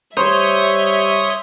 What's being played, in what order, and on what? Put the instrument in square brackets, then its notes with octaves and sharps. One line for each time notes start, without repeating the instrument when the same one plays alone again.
[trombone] G3 [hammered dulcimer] C5 [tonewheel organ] C#5 D#6 [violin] E5